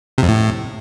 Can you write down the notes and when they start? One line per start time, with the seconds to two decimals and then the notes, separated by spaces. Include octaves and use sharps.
0.18 C3
0.23 F2
0.28 A2